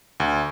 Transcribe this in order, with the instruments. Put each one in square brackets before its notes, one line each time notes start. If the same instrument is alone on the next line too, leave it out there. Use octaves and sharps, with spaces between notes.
[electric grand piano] D2